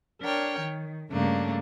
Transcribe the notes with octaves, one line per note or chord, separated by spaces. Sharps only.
D4 A#4 C#5 G5
D#3
G2 C#3 A3 A#3 D4